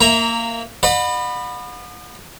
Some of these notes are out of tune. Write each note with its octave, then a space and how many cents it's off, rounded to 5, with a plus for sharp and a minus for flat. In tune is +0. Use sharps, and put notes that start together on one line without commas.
A#3 -15 E5 +0 A#5 +0
D#5 -45 F#5 -40 B5 +0